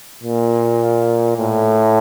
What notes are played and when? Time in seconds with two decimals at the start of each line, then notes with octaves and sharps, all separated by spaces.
0.23 A#2
1.37 A2